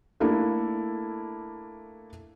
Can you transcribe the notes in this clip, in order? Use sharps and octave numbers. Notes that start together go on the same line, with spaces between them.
A3 A#3 D4 E4 A4